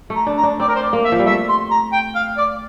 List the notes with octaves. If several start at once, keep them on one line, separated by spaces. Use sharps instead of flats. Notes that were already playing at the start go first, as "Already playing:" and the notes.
A3
A#5
D4
A#5
D4
C4 D5
A#4
C5
D5
A#3
E5
F3
G3
A3 E5
C6
A#5
G5
F5
D5